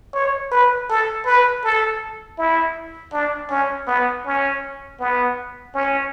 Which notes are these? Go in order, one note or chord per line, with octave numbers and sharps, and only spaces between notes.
C#5
B4
A4
B4
A4
E4
D4
C#4
B3
C#4
B3
C#4